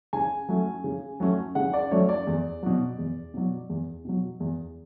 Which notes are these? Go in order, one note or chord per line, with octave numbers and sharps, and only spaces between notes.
C#3 G#5
F#3 A3 C#4
C#3
F#3 A3 C#4
C#3 F#5
D5
F#3 A3 C#4 C#5
D5
E2
B2 F#3
E2
B2 F#3
E2
B2 F#3
E2